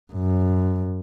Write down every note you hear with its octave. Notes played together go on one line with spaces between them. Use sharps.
F#2